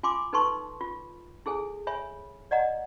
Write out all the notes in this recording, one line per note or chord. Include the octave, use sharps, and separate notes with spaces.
F4 G#5 C6 D6
D#4 A4 B4 A5 C6 C#6
F4
E4 G#4 A4 G#5
C#5 E5 G#5 B5
D5 D#5 F#5 A#5